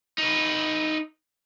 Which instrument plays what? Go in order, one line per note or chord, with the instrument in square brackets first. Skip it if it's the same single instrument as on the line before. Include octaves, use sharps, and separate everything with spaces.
[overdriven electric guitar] D#4 B4